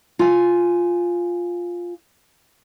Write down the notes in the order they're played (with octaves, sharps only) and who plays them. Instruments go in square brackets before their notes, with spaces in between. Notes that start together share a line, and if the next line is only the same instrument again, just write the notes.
[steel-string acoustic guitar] F4 G#5